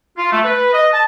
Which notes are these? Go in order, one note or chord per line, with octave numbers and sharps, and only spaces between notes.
F4
A3
B4
D#5
A5